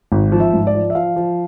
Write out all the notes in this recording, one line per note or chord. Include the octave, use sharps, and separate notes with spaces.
G#1
F3
E5
G#2
D5
F3
E5
F3 F5
F3